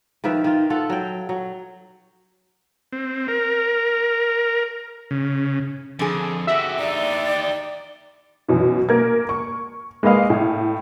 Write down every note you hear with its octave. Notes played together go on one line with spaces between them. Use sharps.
D#3 F3 B4 E5
D#3 F4
F4 A4 F#5
F#3 G5
F#3
C4
A#4
C#3
F2 D3 G#4
F#4 G4 E5
D#4 G4 D5
F#2 B2 E3
A#3 A#4 G#6
C#6
G#3 A#3 B4 D#5 F5
A2